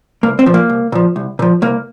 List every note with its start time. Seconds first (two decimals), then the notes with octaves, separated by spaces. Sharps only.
0.23 C2 A#3
0.39 C4
0.46 A#2 F3
0.54 A#3
0.69 C2
0.92 A#2 F3
1.16 C2
1.39 A#2 F3
1.62 C2 A#3